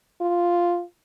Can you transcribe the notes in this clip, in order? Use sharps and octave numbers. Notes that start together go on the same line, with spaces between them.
F4